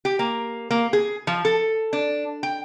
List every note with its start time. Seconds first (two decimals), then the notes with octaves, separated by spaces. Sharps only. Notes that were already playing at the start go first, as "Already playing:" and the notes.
0.05 G4
0.19 A#3
0.71 A#3
0.93 G#4
1.27 F3
1.45 A4
1.93 D4
2.43 G5